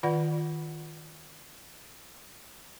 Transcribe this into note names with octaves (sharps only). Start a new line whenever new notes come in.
D#3 F4 B4 D5 F#5